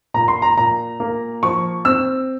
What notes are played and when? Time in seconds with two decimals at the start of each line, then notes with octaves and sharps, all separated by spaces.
0.14 A#2 A#5
0.28 C6
0.42 A#5
0.57 A#2 A#5
1.00 A#3
1.43 F3 C#6
1.85 C4 E6